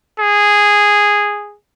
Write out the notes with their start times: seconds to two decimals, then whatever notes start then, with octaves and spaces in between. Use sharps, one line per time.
0.20 G#4